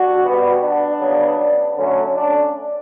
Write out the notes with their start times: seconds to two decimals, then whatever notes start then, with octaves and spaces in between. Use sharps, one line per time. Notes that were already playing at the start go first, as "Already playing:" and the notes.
Already playing: D4 F#4
0.25 B2 G3 B3
0.62 D4
1.00 C#3 F#3 B3
1.76 D3 F#3 A3 C#4
2.14 D4